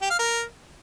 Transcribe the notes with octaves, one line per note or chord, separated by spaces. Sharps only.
G4
F5
A#4